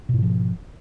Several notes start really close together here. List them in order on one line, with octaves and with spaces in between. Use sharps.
B2 G#2 D3 F3